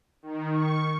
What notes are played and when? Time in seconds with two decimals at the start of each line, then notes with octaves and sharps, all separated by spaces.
0.22 D#3
0.53 C#6